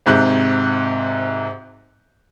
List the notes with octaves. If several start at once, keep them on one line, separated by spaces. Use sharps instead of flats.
G#1 G#2 C3 F#6 G6